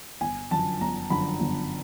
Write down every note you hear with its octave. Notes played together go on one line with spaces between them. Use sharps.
G1 G#5
F#2 D3 F3 A5
G1 A#5
F#2 D3 F3 B5
G1